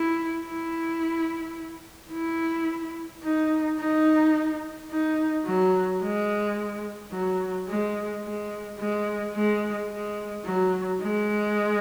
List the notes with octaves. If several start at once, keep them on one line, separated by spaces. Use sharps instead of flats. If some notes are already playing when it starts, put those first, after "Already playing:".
Already playing: E4
E4
E4
D#4
D#4
D#4
F#3
G#3
F#3
G#3
G#3
G#3
G#3
G#3
F#3
G#3